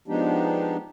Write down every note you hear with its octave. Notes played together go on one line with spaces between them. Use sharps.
F3 G#3 B3 D4 D#4 G4